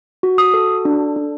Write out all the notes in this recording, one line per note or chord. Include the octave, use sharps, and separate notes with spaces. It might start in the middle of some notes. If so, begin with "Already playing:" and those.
F#4
D#6
A4
D4
D4